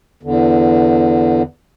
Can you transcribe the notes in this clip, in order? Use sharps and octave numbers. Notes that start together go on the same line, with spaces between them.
E2 D3